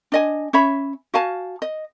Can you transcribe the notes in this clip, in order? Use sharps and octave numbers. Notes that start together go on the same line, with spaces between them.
D4 D#5 G#5
C#4 C#5 E5 B5
F#4 F5 G#5 A5
D#5